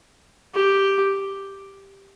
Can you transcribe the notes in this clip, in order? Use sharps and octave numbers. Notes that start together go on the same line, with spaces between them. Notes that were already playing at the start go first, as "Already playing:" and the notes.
G4